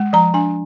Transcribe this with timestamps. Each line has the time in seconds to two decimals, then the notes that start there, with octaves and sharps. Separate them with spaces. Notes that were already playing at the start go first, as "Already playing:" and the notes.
Already playing: G#3
0.13 F3 A#5
0.34 D4 G#5